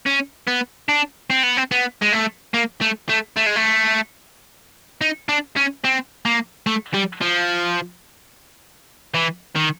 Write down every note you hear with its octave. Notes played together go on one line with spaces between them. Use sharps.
C#4
B3
D4
C4
B3
C4
B3
G#3
A3
A#3
A3
A3
A3
G#3
A3
D#4
D4
C#4
C4
A#3
A3
G3
F3
E3
D#3